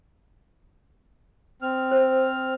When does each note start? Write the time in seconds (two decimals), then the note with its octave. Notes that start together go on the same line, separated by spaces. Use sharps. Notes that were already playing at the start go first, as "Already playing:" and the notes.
1.62 C4 F6
1.91 C5